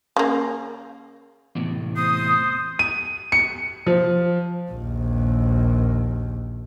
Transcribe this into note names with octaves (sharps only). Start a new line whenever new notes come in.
C#3 A#3
E2 A2 C3
C5 D#6
D#7
C#7
F3
A#1 D#2